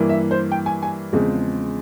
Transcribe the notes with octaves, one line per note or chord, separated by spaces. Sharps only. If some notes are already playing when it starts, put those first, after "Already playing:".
Already playing: G2 E3 A#3
E5
C5
G5
G#5
G#5
E2 C#3 F3 G#3 C4